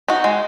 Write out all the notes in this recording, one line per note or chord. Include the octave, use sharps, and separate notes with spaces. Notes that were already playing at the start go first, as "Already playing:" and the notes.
D#4 F#4
G#3